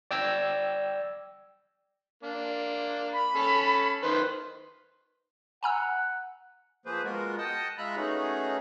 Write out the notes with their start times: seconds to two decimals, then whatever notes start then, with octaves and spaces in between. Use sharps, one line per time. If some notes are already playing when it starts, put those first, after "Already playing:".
0.11 D5 G5 E6 G#6 A#6
2.23 A#3 D4
3.13 B5
3.35 C#4 A4
4.03 D#3 B4 C5
5.63 F#5 G#5 A#5 E6
6.86 F3 A#3 G#4 B4 C5
7.04 G#3 B3 F4 F#4 A#4
7.38 D#5 F#5 G5 A5 D#6
7.78 G#3 F4 E5 A#5 B5 F#6
7.96 A3 B3 C#4 D#4 F#4 G#4